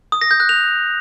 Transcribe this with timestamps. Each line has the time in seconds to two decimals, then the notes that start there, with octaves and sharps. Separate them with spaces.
0.12 D#6
0.21 A#6
0.31 G6
0.40 F#6
0.49 F7